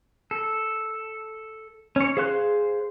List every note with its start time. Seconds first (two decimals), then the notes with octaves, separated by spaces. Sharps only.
0.31 A4
1.96 C#4 C#5
2.17 G#4 C5 F5 C6 F#6